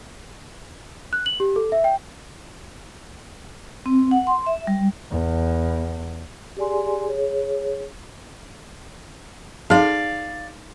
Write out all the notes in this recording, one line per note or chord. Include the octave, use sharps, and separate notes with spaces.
F#6
F#7
G4
A4
E5
G5
C4
F#5
C6
E5
G3
E2
G4 G#4 D5 G#5 C6
G#4 C#5
D#4 G#4 D5 F5 A5